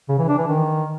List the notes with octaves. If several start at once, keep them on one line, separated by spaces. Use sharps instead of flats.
C#3
E3
D4
E3
D#3